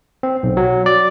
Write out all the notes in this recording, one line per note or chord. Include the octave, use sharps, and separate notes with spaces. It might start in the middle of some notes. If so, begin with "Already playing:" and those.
C4
B1
F#3
D5